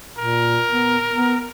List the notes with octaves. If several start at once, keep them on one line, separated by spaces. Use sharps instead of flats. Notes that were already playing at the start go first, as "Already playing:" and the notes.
A#2 A#4
B3
B3